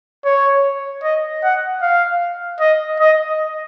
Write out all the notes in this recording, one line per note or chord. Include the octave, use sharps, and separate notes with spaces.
C#5
D#5
F#5
F5
D#5
D#5